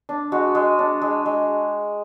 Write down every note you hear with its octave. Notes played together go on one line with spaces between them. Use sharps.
D4
G#3 F#4
G#3
D4
G#3
G#3